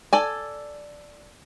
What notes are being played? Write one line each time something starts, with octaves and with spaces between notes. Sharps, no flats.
A4 D5 G#5